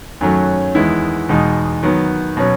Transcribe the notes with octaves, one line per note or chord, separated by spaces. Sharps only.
F#2 D#3 F#3 A3 C#4
E2 D#3 G#3 B3 E4
E2 B2 G#3 D#4
D#3 F#3 B3
B2 F#3 C#4